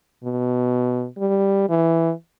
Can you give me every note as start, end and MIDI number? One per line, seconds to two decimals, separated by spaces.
0.23 1.06 47
1.18 1.65 55
1.69 2.12 52